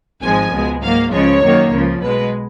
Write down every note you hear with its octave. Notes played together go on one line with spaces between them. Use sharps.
G#1 G#2 F3 G#3 G#5
C#2 B2 G#3
G#2 F#3 A#3 F5
C#2 C#3 F3 G#3 C#5
F#2 D#3 F#3 A#3
C#2 C#3 F3
B1 B2 G#3 B4